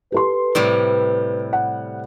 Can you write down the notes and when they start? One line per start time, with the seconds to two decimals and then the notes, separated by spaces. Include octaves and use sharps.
0.12 G4 A4 B4 C6
0.55 A2 C3 G3 D5
1.53 F#5